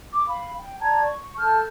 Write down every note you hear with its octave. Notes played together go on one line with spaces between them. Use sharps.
D6
F5 B5
G5
D5 A5 A#5 G#6
C#6
A4 A5 F6 G6